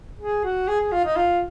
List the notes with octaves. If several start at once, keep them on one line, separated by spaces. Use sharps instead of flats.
G#4
F#4
G#4
G#4
F4
D#4
F4